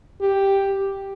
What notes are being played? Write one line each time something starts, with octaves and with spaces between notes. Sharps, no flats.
G4